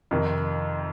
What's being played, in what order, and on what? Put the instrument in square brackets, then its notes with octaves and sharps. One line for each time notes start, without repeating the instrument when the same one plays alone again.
[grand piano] F2 C3 D#3